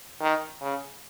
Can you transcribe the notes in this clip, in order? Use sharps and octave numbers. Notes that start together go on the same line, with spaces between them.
D#3
C#3